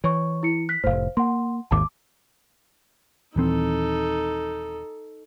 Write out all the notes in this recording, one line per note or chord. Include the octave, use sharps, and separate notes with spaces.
E3 C#5 C#6
E4 C#7
F#6 B6
F1 A2 C5 F5
A#3 F#5 C6
G#1 D#2 G#2 A5 D6
D#1 E3 C4 D#4 A4